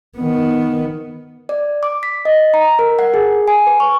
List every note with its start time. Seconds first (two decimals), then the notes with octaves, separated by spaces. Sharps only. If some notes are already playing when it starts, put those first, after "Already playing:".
0.18 D#3 B3
1.49 D5
1.83 D6
2.03 B6
2.25 D#5
2.54 A#5
2.79 A#4
2.99 F#5
3.14 G#4
3.48 G#5
3.67 B4
3.80 C#6